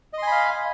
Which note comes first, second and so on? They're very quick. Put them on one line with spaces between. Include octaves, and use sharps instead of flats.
D#5 C6 G#5 B5 F5